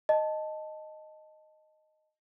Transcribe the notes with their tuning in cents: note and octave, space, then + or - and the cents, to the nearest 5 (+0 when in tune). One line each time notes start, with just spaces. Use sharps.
D#5 -5 A5 +0